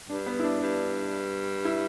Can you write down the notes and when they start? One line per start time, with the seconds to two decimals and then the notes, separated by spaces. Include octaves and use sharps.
0.09 G2 D4
0.26 B3
0.39 E4
0.44 D4
0.61 G2
1.65 E4